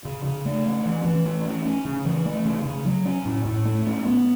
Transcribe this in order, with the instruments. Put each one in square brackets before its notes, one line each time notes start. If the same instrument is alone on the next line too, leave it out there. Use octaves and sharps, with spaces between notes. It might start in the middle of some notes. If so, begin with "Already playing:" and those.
[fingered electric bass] C#3
C#3
A3
C#4
E3
E3
A3
C#4
C#4
C#3
E3
A3
C#3
C#3
F#3
C#4
A2
A2
A3
C#4
B3